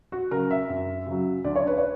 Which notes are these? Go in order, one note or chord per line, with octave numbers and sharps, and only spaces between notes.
F#4
C#3 F#3 A#4
E5
F#2
C#3 F#3
D2 D5
C#5
B4
C#5